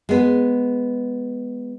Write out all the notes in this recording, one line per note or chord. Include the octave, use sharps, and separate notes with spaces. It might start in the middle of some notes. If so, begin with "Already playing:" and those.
G#3 B3